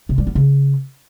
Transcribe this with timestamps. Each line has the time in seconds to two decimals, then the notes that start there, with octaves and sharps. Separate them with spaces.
0.09 C3
0.18 G3
0.27 B3
0.35 C#3